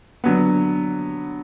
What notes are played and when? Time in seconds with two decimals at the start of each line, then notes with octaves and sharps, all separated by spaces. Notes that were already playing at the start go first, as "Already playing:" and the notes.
0.24 D3 F#3 B3